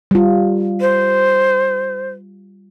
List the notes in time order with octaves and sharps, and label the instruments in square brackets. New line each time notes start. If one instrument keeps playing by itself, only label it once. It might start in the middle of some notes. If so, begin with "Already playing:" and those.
[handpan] G3 F4
[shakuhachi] C5